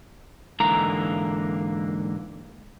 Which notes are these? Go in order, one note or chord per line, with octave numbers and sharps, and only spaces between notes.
G#2 D3 E3 A#3 A#5